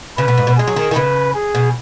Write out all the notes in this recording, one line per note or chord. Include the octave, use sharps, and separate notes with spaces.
C#3 B4
B2
G#2
B2
G#3 G#4
F#3
D#3
D#3
C#3 B4
G#4
B2